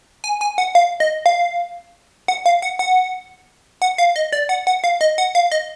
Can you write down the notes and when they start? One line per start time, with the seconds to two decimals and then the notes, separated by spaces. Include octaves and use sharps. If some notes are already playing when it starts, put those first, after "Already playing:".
0.24 G#5
0.41 G#5
0.58 F#5
0.75 F5
1.00 D#5
1.26 F5
2.28 F#5
2.46 F5
2.62 F#5
2.79 F#5
3.82 F#5
3.98 F5
4.16 D#5
4.32 D5
4.49 F#5
4.67 F#5
4.84 F5
5.01 D#5
5.18 F#5
5.35 F5
5.51 D#5